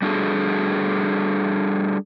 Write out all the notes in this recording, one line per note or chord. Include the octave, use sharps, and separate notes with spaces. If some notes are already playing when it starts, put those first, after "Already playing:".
G3 D4 F#4 G#4 A4